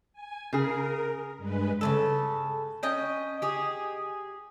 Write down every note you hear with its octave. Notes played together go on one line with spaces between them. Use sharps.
G#5
C#3 G#4 A#4
G2 G#3 B4
C#3 E3 A4
C#4 D#5 G5
G4 G#4